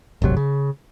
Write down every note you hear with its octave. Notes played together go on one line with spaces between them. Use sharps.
D1 G#1 C3 F#3
C#3